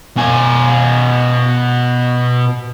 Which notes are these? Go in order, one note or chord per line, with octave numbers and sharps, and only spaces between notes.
B2 G#5